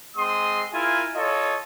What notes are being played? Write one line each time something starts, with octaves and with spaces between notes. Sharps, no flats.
G#3 C4 C6 D#6
E4 F4 A#4 G#5
F4 A4 C#5 D#5